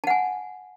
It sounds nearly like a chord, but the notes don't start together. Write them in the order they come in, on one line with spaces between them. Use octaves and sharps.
A5 F#5 G#5